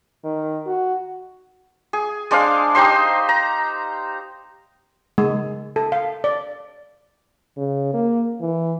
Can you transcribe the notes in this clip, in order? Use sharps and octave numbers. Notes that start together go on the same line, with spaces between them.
D#3
F#4
G#4
G#3 D4 C5 F5
D#4 G4 C5 C6
A#5
G#3
A4
F5
D5
C#3
A#3
E3